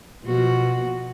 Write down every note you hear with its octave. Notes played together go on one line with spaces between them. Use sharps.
B2 F3 F#4